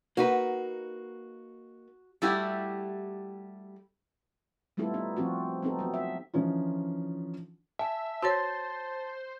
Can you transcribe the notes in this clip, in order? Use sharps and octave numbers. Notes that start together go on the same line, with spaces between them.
A#3 D#4 F#4 B4
G3 A3 E4 F#4 G4
G3 A3 B3 E4 F4 A4
B3 D#4
F3 C4 F4 F#4
B3 C4 D#4 A4
F#3 B3
E5
D3 E3 F3 C#4 D#4 F4
E5 G#5 A5
F#4 C5 C#5 A5 C6 A6